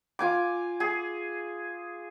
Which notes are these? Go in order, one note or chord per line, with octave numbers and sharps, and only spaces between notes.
F4 G#5 D6
G#4